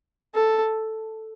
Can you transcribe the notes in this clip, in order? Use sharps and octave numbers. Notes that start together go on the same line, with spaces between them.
A4